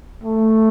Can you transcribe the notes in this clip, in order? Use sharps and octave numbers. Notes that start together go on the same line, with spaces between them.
A3